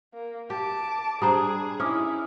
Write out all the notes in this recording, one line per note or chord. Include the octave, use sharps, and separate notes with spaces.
A#3
G4 A5 D6
G3 D4 G#4 C5 A#5 D#6
C#4 D#4 E4 D6 D#6 F6